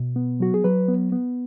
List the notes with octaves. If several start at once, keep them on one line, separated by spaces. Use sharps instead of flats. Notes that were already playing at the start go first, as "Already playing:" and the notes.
Already playing: B2
B3
F#3 F#4
G#4
F#3 B4
B3
B3